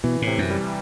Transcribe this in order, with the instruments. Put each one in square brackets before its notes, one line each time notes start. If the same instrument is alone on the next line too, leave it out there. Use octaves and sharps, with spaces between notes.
[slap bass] B2 [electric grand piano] E3
[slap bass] A2
[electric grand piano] C3
[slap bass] F#2
[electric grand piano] G3